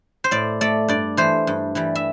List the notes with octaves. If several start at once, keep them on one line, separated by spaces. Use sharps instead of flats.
C5
A2 D5
A3 D5
G2 D5
E3 A3 C5
G2
E3 G3
E5